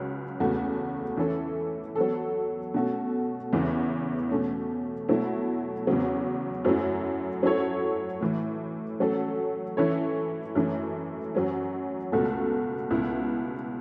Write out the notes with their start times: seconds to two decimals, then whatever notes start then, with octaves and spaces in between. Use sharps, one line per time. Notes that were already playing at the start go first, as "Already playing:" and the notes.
Already playing: C#2 C#3 F#3
0.40 E2 C#3 A3 F#4
1.17 E3 C#4 A4
1.96 F#3 B3 A4
2.74 B2 A3 C#4 F#4 A4
3.52 E2 C#3 E3 B3
4.31 B2 A3 C#4
5.09 B2 F#3 A3 E4
5.87 E2 C#3 F#3
6.65 F#2 F#3 A3 E4
7.43 F#3 C#4 E4 A4 C#5
8.21 A2 E3 A3
9.00 F#3 A3 C#4 A4
9.77 E3 C#4 E4 A4 C#5
10.55 F#2 E3 A3 C#4
11.35 F#2 F#3 C#4
12.12 C#2 B2 A3 F#4 A4
12.90 C#2 B2 B3 E4